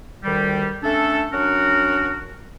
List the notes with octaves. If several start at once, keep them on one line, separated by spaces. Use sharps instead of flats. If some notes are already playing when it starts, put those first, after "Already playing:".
D2 D#3 G3
A3 C#4 D4 A4
F#3 C#4 D4 F#4 A#4